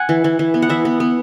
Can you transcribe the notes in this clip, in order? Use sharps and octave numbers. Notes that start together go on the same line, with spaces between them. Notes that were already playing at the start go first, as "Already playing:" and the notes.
Already playing: F#5 G#5
E3
E3
E3
B3
F#5
E3 E5
B3
B3